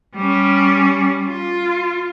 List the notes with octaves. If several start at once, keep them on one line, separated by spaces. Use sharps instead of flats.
G3 C#4
F4